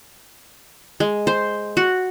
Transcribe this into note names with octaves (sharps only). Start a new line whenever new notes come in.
G#3
C5
F#4